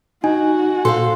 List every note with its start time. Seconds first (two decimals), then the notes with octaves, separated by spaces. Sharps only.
0.24 D#4 F#4 G#5
0.85 A#2 A4 C5 F5 C6